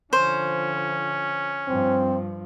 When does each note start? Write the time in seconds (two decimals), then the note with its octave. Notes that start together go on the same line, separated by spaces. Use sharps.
0.13 D3 F3 C#4 C5
1.69 G2 F3 C4